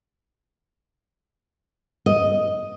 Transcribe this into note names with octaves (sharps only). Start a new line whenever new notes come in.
D#5